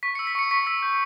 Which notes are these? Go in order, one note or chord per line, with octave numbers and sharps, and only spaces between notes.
C#6 B6
E6 C#7
B6
C#6 C#7
C#6 B6
E6 B6
G6